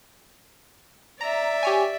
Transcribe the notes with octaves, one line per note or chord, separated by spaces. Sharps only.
D5 E5 A#5
G4 C#5 G#5